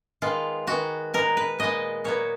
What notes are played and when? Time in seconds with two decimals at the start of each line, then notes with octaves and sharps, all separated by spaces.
0.22 D#3 G#3 B3 F4
0.67 D#3 G#3 B3 F#4
1.14 A#2 G#3 B3 A#4
1.37 B4
1.59 A#2 G#3 B3 D#5
2.04 A#2 F#3 B3 C#5